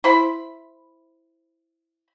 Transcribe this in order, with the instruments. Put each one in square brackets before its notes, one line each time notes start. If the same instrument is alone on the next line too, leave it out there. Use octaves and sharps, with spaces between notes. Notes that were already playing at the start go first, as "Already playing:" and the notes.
[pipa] E4 C5 B5